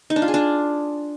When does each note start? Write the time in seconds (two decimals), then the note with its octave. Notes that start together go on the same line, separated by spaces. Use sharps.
0.10 D#4
0.16 D4
0.22 F4
0.28 G#4
0.34 D4